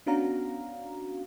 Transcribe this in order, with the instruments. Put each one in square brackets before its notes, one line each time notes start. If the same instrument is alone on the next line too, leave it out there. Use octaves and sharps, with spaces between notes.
[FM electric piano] B3 C#4 D4 F#4 F5 A#5